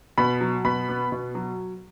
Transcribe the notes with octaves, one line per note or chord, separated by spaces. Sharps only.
B2 B5
F#3
B2 B5
B3
B2
F#3